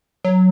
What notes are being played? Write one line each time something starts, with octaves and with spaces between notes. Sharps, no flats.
F#3